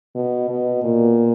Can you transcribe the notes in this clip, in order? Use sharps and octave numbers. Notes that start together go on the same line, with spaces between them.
B2
B2
A#2